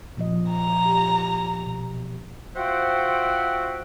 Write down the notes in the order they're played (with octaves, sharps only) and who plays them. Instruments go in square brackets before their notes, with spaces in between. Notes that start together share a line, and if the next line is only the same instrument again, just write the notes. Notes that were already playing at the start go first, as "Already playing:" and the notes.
[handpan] A#2 F3 D#5
[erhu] A#5
[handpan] G4
B2
[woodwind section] F4 F#4 C5 E5 F#5 G5